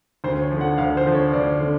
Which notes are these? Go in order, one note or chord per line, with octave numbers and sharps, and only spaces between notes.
D2 C5
C#5
D3 F3
F#5
D2 F5
C5
D3 F3
C#5
D2 D5
D3